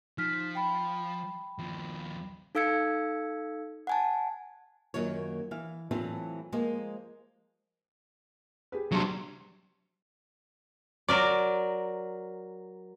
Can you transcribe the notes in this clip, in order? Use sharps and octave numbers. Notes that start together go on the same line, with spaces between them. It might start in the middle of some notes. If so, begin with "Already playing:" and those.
F3 D#4 F6 B6
G5 B5
D#2 F3
D#4 A4 F5 E6 G#6 C#7
F#5 G#5 A5
F#2 D#3 F#3 A#3 F4 C#5
E3 F5
A2 E3 F#3 C4 F4 A4
F3 G#3 A#3 C5 D#5
G4 G#4 B4
C3 F#3 G3 D4 C6
F#3 A#4 D5